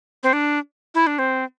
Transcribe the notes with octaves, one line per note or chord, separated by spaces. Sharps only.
C4
D4
E4
D4
C4